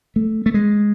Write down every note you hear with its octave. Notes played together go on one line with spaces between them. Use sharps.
A3
A3
G#3